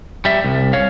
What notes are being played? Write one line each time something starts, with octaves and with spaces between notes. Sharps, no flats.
G3 E5
C2
C#5 F5